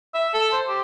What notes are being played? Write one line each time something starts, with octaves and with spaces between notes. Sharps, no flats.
E5
A4
C5
G4